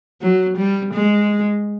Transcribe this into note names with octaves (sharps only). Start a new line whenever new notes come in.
F#3
G3
G#3